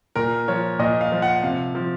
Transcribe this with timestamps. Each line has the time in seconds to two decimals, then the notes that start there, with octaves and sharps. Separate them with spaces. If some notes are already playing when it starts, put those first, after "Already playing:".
0.16 A#2 A#4
0.48 F3 C#5
0.79 A#2 D#5
1.01 F5
1.12 F3
1.22 F#5
1.43 C3 F5
1.75 F3